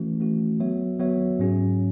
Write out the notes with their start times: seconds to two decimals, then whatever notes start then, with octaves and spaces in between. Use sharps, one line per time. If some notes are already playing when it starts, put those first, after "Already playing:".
Already playing: E3 A3 C#4 F#4
0.20 E3 A3 C#4 F#4
0.60 F#3 B3 F#4 C#5 E5
0.99 F#3 B3 F#4 C#5 E5
1.39 G#2 F#3 C#4 G#4